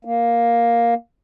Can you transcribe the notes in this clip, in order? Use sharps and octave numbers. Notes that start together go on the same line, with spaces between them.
A#3